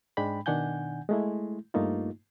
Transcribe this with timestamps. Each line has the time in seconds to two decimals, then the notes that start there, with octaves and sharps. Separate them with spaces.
0.17 G#2 G#3 D4 G5 B5
0.46 B2 D#3 D4 F#5 G#5 G6
1.09 G#3 A3 E4
1.74 G2 A3 A#3 D#4 F4